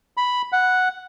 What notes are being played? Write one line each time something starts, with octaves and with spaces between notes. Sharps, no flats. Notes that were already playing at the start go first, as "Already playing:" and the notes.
B5
F#5